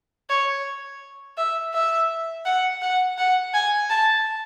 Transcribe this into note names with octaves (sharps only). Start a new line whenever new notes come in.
C#5
E5
E5
F#5
F#5
F#5
G#5
A5